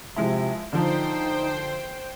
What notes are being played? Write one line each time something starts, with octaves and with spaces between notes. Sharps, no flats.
C3 F3 G#3 E4
D3 F3 D#4 C5 G5